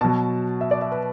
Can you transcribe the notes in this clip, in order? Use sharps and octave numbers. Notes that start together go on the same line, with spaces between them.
B2 F#3 A5
E5
D5
E5
B4